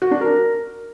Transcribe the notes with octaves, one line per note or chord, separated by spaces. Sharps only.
F#4
D4
A#4